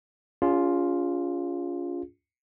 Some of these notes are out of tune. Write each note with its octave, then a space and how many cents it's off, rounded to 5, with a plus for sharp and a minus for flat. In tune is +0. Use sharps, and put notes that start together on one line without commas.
C#4 +35 F4 +0 G#4 -30